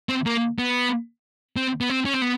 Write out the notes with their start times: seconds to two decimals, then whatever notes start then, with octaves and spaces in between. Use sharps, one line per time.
0.09 C4
0.26 A#3
0.59 B3
1.56 C4
1.81 B3
1.90 C4
2.05 C#4
2.14 C4
2.22 B3